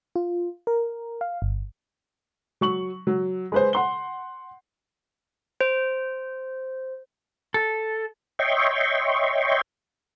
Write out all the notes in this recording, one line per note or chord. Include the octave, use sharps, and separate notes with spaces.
F4
A#4
F5
G1
F#3 C#6 F#7
F#3
G#3 B4 C5
F#5 C6 G7
C5
A4
C#5 D#5 E5 G5 C6 C#6